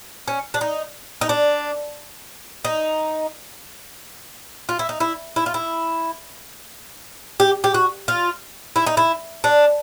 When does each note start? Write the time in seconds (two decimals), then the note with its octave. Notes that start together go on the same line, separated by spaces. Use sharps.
0.28 C#4
0.54 D4
0.61 D#4
1.21 D#4
1.29 D4
2.65 D#4
4.69 F4
4.79 E4
4.89 D#4
5.00 E4
5.36 E4
5.46 F4
5.54 E4
7.40 G4
7.64 G4
7.74 F#4
8.08 F4
8.76 E4
8.87 D#4
8.97 E4
9.44 D4